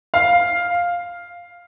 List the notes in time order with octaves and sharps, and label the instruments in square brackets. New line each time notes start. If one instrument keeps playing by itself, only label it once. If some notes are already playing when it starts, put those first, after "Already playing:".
[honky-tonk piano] F5